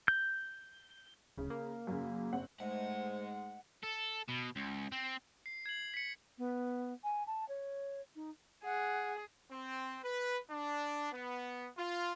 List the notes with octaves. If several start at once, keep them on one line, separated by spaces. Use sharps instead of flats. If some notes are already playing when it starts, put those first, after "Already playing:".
G6
D1 C#3
A#3
F#2 C#3
F#1 C4 F#5
G#2 G#3 A3 C5 F#5
A4
B2
C#2
C4
C7
G#6 C7 F#7
B6 C#7
B3
G#5
A5
C#5
D#4
G#4 F#5
C4
B4
D4
B3
F4